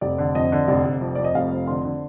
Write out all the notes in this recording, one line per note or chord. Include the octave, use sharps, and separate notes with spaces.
F1 D5
D3
F2 D#5
D3
F1 D5
F1
F2
F2 D5
D#5
F1 F5
F2
D3 C6
D3